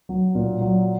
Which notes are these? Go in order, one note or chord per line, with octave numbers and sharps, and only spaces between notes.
F#3
A#2
F#3